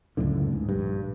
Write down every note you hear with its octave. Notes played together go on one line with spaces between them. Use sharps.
C#2 F#2 A2 D3
G#2
A#1 G2